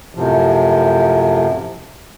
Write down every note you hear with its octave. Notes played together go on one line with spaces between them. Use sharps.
F#2 A2 C3 F3